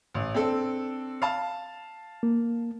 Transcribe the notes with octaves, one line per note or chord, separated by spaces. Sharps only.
A1
C4 D4 A4
F5 A5
A#3